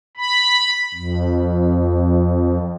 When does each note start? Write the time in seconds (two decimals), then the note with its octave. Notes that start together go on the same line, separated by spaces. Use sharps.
0.17 B5
0.94 F2